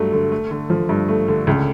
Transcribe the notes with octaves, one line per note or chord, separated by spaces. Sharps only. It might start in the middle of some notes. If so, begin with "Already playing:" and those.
Already playing: G2 F#3 A3
D3
A3
D3
F3
G2
A3
D3
C#2